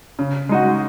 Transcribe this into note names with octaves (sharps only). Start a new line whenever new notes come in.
C#3
G#3 D#4 F#4